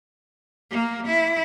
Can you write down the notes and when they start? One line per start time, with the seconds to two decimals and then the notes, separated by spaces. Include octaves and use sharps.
0.70 A#3
1.07 E4